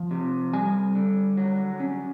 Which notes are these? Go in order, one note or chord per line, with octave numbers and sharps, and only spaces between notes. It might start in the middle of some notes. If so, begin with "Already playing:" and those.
Already playing: F3
C3
G3 G#5
D3
F#3
C#4